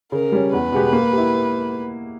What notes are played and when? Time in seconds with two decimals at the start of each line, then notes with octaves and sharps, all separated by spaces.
0.12 C#3 A#4
0.32 G3 C#4
0.53 E2 B4
0.72 B2 G#3 B3 G4
0.93 A#3
1.13 E4 G4